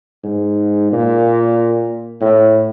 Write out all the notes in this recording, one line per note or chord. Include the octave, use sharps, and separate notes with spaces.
G#2
A#2
A2